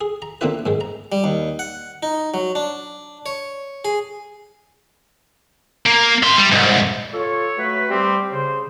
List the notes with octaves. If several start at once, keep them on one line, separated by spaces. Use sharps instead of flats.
G#4
A#5
D3 A#3 C4 E4 F4 B4
G#2 D#3 G#3
A#5
G3
D#2
F#5
D#4
F#3
D4
C#5
G#4
A#3
E5 C6
G3
C2 G#2
F4 A4 C#5
F#3 A3 B4
G3 C4 G4
C#3 C5